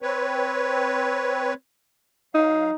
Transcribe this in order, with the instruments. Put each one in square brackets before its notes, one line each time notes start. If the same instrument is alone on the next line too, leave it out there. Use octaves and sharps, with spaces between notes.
[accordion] C4 B4 C#5
[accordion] F#3 F5 [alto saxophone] D#4